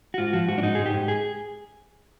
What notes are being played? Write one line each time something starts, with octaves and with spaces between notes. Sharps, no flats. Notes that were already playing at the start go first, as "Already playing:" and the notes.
F#4
G#2 F4
F3 F#4
G#2 F#4
D4
G#2 D#4
G#2 G#4
G4
G#2
G#4